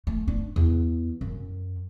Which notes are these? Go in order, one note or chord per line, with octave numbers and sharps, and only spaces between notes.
A3
D4
E2
F#2